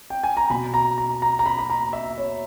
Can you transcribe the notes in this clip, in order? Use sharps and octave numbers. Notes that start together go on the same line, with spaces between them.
G5
G#5
A#5
B2 B5
A#5
A#5
A#5
A#5
B5
B5
A#5
E5
C#5